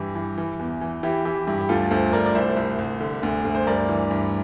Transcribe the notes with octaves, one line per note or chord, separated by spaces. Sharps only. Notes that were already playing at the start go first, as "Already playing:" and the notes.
Already playing: G2 E3 E4 G4
E3
E3
E2
E3
E3 E4 G4
E3 E4 G4
G2 E4 G4
G4
D2 F4 A4
D2 A4 C5
D2 A#4 D5
D5
C2 C5 E5
C2
C2
D3
D2
D2
C5
G2 A#4 D5
E3
G2